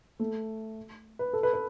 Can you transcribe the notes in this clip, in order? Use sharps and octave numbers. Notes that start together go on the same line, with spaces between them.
A3
B4
A4
B4
B4